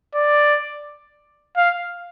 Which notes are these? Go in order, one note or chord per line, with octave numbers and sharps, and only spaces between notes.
D5
F5